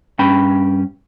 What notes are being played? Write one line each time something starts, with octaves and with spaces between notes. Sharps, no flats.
G2 C#4 G5 B5